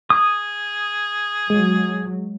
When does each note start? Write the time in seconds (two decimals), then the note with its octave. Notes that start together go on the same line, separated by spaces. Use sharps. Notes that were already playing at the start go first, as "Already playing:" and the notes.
0.10 G#4 D#6
1.50 F#3 G#3